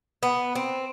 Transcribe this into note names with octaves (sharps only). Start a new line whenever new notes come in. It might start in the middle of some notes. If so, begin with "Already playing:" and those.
B3
C4